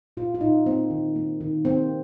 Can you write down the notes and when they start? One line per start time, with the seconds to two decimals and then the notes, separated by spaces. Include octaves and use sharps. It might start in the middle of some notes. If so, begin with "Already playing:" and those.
0.17 A#2 F4
0.35 F4
0.41 A#2 D#4
0.66 A#3 C4
0.90 D#3
1.16 A#3
1.41 D#3
1.65 A#3 C4